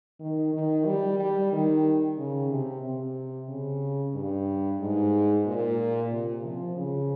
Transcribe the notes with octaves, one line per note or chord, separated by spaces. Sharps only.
D#3
D#3
G3
G3
D#3
C#3
C3
C3
C#3
G2
G#2
A#2
C3
F3
C#3